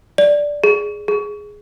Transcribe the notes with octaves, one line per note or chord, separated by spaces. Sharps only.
D5
G#4
G#4